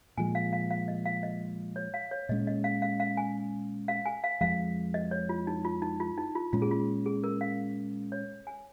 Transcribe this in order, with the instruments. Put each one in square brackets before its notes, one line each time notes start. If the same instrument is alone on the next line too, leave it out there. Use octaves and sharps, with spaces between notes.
[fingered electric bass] A#2 F3 G#3 [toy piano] G#5
[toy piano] F5
F5
F5
D#5
F5
D#5
C#5
F5
C#5
[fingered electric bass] A#2 G#3 C#4 [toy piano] D#5
[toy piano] D#5
F5
F5
F5
G#5
F5
G#5
F5
[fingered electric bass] F2 F3 G#3 [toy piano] F5
[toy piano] D#5
C#5
F4
D#4
F4
D#4
F4
D#4
F4
[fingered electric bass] A#2 G#3 C#4 [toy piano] F4
[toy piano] G#4
F4
G#4
A#4
F5
C#5
G#5